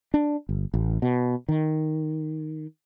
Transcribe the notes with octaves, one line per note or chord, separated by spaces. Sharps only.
D4
G1
A1
B2
D#3